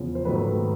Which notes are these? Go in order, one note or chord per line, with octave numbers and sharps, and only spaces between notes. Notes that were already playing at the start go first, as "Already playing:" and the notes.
Already playing: E2 C#3 F3
C5
G#2 D#3 F#3 A3 A4 B4